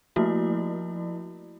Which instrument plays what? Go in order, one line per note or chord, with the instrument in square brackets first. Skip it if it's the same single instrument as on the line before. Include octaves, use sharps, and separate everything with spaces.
[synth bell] F3 A3 A#3 E4 F#4